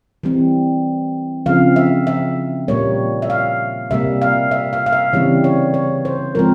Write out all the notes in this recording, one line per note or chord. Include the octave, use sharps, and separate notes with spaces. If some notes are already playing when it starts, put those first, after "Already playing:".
E3 G3 C4
C#3 F3 C4 F5
E5
E5
A#2 G3 A#3 C#5
E5
F5
C3 G3 A#3 E5
F5
E5
F5
F5
E5
C#3 E3 G3 C4 C#5
C#5
C#5
C5
F3 G#3 C4 A#4